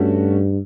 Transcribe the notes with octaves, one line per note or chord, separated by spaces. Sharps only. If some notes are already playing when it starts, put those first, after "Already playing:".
Already playing: G2 A3 C#4 F#4 A4